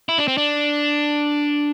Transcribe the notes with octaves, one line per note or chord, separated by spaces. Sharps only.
E4
D4
C4
D4